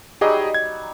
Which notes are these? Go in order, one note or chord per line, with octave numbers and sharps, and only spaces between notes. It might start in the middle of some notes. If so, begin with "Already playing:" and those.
F#3 G3 D#4 G4 G#4 D#5
G#6